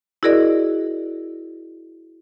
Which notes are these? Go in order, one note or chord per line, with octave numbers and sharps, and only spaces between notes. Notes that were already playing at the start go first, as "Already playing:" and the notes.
E4 F#4 G#4 A#4 D5 D#5